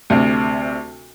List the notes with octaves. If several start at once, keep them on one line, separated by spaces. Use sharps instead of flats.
D2 C3